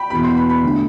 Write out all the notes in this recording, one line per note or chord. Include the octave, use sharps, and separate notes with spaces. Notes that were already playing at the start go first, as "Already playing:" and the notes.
Already playing: G5 B5
E2 B2 B3 B5
C6
B5
B5
D3 A3 D4